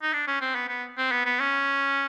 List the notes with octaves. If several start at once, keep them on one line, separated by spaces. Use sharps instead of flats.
D#4
D4
C#4
C4
B3
B3
C4
B3
B3
C#4